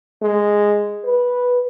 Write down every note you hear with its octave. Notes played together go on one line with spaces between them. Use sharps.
G#3
B4